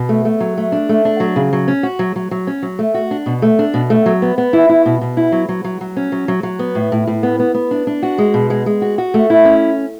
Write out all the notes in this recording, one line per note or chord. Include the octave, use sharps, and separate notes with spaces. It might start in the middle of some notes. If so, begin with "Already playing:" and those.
Already playing: B2
A3
A3
F#3
A3
D4
A3
D4
F#3
C#3
F#3
C#4
F#4
F#3
F#3
F#3
C#4
F#3
A3
F#4
D4
B2
A3
D4
B2
A3
F#3
B3
B3
E4
E4
B2
B2
E4
F#3
F#3
F#3
F#3
C#4
F#3
F#3
F#3
B3
A2
A2
A2
B3
B3
B3
D4
D4
F#4
G#3
B2
G#3
G#3
F#4
F#4
A3
E4
C#4